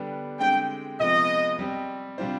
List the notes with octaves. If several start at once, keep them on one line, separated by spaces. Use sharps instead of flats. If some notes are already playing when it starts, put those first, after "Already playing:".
Already playing: D3 G3 B3 D4 G4
D3 G#3 C4 G4 G5
C3 F3 G#3 B3 D#5
G3 C4 G4
C3 G3 D4 F4 C5